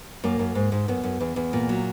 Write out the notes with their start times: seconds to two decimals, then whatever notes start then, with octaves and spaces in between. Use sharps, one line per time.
0.24 F#2 A#3
0.39 F#2
0.55 G#2
0.72 G#2
0.88 F#2 B3
1.04 F#2
1.20 E2
1.36 E2
1.53 A#2
1.69 F#3